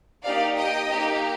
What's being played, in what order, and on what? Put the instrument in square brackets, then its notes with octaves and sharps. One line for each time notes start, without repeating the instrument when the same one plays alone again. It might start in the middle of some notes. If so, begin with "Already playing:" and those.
[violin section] A#3 D#4 G4 D5 F5
D#5 G5
A#3 D#4 G4